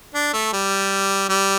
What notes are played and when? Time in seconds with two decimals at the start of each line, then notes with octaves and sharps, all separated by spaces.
0.14 D4
0.33 A3
0.53 G3
1.29 G3